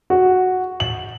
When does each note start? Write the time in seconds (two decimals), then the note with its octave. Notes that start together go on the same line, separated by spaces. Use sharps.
0.10 F#4
0.80 F#7